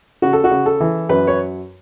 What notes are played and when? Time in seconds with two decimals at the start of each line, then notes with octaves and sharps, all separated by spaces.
0.22 C#3 F#4
0.33 A4
0.44 F#4
0.51 C#3
0.66 A4
0.81 E3
1.09 F#2 B4
1.27 C#5